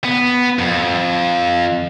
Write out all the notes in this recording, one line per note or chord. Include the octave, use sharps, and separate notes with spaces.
B3
F2